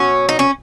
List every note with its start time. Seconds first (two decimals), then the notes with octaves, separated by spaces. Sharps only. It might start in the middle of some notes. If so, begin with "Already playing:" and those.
Already playing: B2 F#3 C#4
0.29 D#4
0.39 C#4